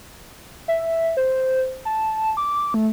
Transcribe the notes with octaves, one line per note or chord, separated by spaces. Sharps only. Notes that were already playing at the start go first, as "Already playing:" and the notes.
E5
C5
A5
D6
A3